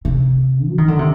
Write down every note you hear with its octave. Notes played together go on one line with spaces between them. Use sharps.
C3
F#3
D#3
D3
C3